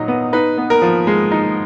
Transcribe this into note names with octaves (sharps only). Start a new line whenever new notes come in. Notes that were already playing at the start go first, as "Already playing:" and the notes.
Already playing: A#2 F#3 D#4 D#5
B3
D#4 B4
B3
A#4
F3
G#3
D#4